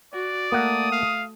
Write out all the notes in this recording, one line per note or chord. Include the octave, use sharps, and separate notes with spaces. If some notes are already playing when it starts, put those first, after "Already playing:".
F#4 D5
A3 A#3 F#5 D#6
F5